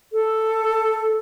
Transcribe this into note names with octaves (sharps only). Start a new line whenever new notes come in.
A4